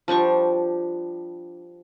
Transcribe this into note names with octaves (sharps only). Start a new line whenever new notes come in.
F3 G3 D4 C#6